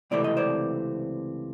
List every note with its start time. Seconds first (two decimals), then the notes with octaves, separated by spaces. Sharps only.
0.11 C#2 C3 E3 A3 C4 D5
0.24 D#5
0.37 C5 D5